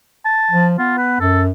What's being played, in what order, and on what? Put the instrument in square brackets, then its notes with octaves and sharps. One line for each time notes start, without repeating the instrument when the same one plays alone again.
[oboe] A5
[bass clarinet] F3
[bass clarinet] B3 [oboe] F4
[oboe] B4
[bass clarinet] F#2 [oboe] A4